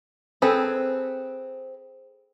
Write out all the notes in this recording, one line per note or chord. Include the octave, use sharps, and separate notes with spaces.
C4 G#4 A4 B4